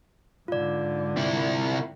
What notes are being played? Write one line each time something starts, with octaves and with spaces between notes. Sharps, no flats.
G#2 D3 F4 D5
C3 E4